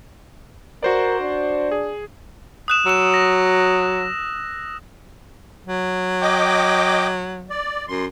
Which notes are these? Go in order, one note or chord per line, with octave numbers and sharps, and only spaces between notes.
F#4 A#4 C5 D5
D4
G#4
D#6 F#6 E7
F#3 E6 E7
A#6
F#3
D#5 G5 D6
D5
F#2 C6